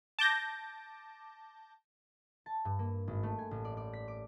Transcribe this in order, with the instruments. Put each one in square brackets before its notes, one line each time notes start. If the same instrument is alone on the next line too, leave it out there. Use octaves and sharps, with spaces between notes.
[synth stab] A5 D6 G6 A#6
[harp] A5
G2
A#3
G#1
A3
G#5
A1
D5
D5
B6
D6